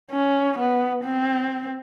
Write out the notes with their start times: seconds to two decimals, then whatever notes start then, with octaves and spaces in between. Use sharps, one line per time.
0.11 C#4
0.59 B3
1.04 C4